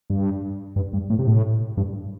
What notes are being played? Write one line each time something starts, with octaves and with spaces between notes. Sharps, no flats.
G2
G2
G2
A2
C3
A2
G2